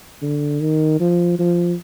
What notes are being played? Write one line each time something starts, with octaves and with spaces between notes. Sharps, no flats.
D3
D#3
F3
F3